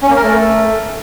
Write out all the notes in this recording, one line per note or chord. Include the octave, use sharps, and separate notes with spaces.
C#4
A#3
A#4
A3